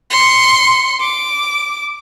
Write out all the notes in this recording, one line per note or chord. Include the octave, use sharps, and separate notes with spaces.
C6 C#7
D6